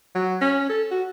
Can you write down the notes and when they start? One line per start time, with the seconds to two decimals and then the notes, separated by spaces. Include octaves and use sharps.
0.15 F#3
0.42 C#4
0.70 A4
0.91 F#4